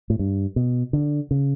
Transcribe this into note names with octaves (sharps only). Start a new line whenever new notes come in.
A2
G2
B2
D3
C#3